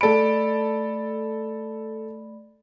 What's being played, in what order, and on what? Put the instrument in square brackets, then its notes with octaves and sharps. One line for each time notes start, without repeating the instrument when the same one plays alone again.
[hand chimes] A3 D5 B5 [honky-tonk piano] A4 D7